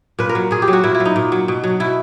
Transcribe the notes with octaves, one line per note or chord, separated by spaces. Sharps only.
A#2 B4
A#4
F#3
A#2 G#4
G4
F#3
F#4
A#2 E4
E4
F#3
D#4
A#2
F#3
B2
F#3
B2 E4